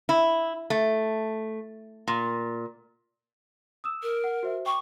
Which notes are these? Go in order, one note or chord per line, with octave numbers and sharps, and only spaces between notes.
E4
A3
A#2
D#6 E6 E7
A#4
F#5
F#4 C5 E5
G5 C#6 D6